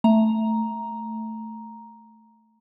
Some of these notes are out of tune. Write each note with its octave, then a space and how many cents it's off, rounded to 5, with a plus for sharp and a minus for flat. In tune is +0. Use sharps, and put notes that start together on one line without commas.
A3 +0 A#5 +5